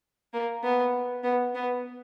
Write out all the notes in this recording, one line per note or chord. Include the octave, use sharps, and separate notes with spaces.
A#3
B3
B3
B3